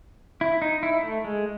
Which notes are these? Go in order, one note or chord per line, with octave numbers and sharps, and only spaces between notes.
E4
D#4
E4
A3
G#3